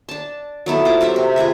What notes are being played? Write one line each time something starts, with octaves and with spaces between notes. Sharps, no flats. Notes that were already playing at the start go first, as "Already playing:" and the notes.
D4 A5
F#3 B3 E4 A4
F4 C5 D6
F#3 C4 G4 E5
C3
F4 G#4 B4 E5